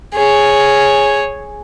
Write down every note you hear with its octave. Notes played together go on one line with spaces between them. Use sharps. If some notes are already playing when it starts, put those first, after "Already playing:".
G#4 C#5